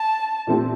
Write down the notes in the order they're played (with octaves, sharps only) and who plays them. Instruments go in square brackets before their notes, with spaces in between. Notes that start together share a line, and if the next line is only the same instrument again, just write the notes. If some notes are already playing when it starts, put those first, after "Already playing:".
Already playing: [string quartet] A5
[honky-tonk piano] A#2 A3 C4 G4